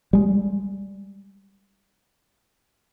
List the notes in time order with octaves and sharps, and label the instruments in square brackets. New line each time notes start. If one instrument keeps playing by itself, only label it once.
[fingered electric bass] G3 G#3